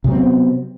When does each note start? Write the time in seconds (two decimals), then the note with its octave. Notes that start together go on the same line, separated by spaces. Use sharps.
0.04 C3
0.08 F#3
0.12 C4
0.15 B3